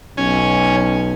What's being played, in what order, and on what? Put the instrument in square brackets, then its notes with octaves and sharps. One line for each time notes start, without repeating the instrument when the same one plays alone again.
[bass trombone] B1 [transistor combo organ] C#4 G#5